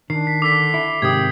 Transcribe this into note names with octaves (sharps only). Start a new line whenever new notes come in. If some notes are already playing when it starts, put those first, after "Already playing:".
D#3 D4 C7
B6
D3 D6 E6 B6
E4
G#2 C3 D#3 G4 D#6 G#6